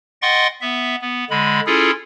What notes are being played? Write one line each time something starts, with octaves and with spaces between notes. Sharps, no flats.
D#5 F#5 G5 C6 C#6 A6
B3 E5
B3
D3 G#3 B5
C#4 E4 F4 G#4 A4